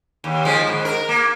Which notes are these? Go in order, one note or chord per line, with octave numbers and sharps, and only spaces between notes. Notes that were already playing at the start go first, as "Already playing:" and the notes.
D#2
D#3 F3 G#3
G#2
A#4
A#3